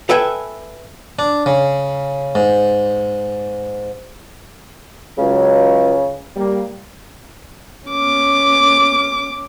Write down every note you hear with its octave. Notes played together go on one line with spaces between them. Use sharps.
A4 B4 E5 G5 G#5
D4
C#3
G#2
C#2 C#3 F#3
G3 A#3
C#4 D6